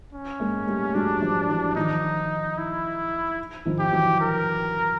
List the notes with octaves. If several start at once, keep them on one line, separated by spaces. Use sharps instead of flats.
C#4
G#3 A#3
G3 A3
F#3 G#3 D4
F3 G3
E3 F#3
D#3 F3 D#4
E4
D#3 F3
G4
E3 F#3
A#4